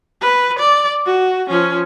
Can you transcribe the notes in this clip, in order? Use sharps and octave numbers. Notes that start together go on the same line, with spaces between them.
B4
D5
F#4
F3 C#4